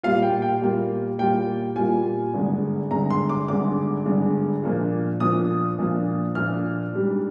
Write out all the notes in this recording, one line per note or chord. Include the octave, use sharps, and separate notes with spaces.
A#2 G3 A#3 F4 F5
G5
G5
A#2 G3 A#3 F4
A#2 G3 A#3 F4 G5
A#2 G3 A#3 F4 G#5
G#1 G2 D3 G#3
G#1 G2 D3 G#3 A#5
C6
D6
G#1 G2 D3 G#3 D6
G#1 G2 D3 G#3
A#2 F3 A#3 D4 F4
A#2 F3 A#3 D4 F4 D#6
A#2 F3 A#3 D4 F4
A#2 F3 A#3 D4 F4 F6
G#2 G3 D4